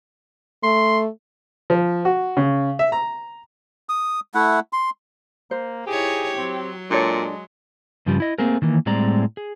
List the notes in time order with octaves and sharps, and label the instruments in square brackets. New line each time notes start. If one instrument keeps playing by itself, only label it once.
[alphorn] A3 [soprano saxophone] C6
[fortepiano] F3
F#4
C#3
E5
A#5
[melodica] D#6
A3 E4 F#5
C6
[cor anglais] A#3 [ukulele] C5
[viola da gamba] D#4 E4 C#5 [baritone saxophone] G4 [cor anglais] G#4
[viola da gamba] F#3 [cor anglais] C4
[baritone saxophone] A#2 [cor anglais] G#3 [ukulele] D4 A4 C#5
[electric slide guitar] G2 C#3 F3 G3
E4 D#5
A3 A#3 C4 G#4 A#4
D#3 E3 A#3
A2 G3 G#3 C4 D5 A#5
G#4